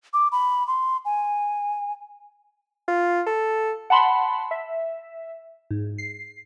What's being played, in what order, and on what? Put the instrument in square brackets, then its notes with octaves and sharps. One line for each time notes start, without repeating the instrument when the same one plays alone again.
[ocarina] D6
B5
C6
G#5
[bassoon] F4
A4
[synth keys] F#5 A5 B5 C6
E5
G#2
C7